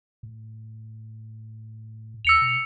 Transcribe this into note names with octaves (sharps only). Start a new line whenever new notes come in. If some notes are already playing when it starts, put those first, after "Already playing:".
A2
E2 E6 C#7 F7
B2